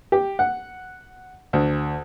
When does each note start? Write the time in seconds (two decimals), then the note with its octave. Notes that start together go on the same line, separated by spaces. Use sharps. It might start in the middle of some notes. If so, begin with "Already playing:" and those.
0.12 G4
0.39 F#5
1.53 D2